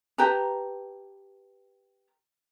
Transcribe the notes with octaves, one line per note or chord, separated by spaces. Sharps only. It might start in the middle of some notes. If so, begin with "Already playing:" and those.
G4 B4 A5 A#5